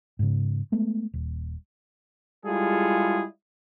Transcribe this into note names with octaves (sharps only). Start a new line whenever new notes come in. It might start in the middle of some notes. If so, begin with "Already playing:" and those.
G#2 C#3
G#3 A3 B3
D#1
G3 G#3 E4 F4 G#4 A4